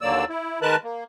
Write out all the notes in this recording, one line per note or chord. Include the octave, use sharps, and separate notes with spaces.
D#2 D3 F#3 A#3 D5 E6
E4
D#3 G#3 A#4 B4 A5 F#6
A#3